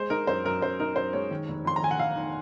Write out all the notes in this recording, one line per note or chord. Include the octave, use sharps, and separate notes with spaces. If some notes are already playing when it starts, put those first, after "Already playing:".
Already playing: G#3 C5
D#4 A#4
F#2 C5
F#2 A#4
F#2 C5
D#4 A#4
F#2 C5
G#3 C#5
D#3
F1
F2 C6
A#5
D#3 G#5
F#5
F1 F5
D#3